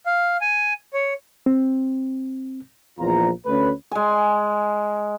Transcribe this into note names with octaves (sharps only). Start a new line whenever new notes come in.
F5
G#5
C#5
C4
A#1 E2 F3 F4 A#5
D2 A3 C#4 B4
G#3 G#5